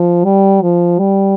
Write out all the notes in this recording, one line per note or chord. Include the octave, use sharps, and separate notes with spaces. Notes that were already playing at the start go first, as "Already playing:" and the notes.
Already playing: F3
G3
F3
G3